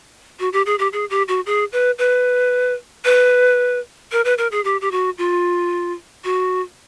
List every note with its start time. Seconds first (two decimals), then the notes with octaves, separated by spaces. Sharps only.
0.40 F#4
0.53 G4
0.66 G#4
0.79 G4
0.93 G#4
1.10 G4
1.28 F#4
1.46 G#4
1.72 B4
1.98 B4
3.05 B4
4.12 A#4
4.25 B4
4.38 A#4
4.51 G#4
4.64 G4
4.81 G4
4.91 F#4
5.18 F4
6.24 F#4